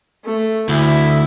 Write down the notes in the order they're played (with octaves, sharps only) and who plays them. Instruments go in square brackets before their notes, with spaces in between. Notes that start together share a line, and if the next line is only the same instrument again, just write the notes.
[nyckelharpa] A3
[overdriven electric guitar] D2 [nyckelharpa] E4